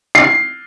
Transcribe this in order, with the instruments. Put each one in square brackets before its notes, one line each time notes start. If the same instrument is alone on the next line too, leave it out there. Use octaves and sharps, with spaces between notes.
[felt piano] C7